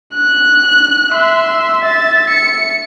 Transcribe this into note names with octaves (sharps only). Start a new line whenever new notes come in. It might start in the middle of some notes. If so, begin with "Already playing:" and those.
F#6
E5 C6
E5 A6
C#7